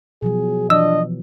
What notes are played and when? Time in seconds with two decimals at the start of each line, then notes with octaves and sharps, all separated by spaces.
0.22 B2 F3 F#3 G#4
0.70 E3 F3 D4 D#5 E6